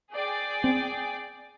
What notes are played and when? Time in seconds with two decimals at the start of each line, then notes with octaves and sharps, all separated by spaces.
0.13 G#4 D5 G5
0.64 C4